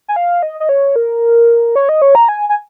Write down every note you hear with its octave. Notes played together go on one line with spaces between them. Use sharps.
G#5
F5
D#5
D#5
C#5
A#4
C#5
D#5
C#5
A#5
G#5
G#5